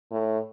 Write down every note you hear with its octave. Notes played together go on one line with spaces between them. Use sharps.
A2